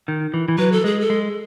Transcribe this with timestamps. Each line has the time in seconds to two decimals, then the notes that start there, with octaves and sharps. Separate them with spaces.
0.08 D#3
0.34 E3
0.48 E3
0.58 F#3 B4
0.72 A4
0.84 G#3 G#4
1.00 A4
1.10 G#3